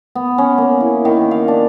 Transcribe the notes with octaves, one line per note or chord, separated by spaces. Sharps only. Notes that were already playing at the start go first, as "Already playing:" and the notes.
B3
C#4
A#3
E4
D#3
F5
D4